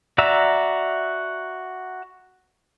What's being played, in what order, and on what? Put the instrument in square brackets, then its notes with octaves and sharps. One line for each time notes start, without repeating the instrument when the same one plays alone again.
[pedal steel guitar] F#4 D5 E5 A#5 E6